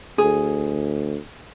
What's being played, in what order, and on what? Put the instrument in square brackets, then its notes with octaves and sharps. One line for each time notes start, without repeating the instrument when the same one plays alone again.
[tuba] D2 [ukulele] G#4